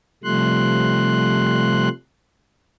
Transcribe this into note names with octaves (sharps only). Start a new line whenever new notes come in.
C3 F3 G3 A3 C6 F#6